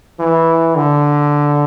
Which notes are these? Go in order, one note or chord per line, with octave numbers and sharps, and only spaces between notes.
E3
D3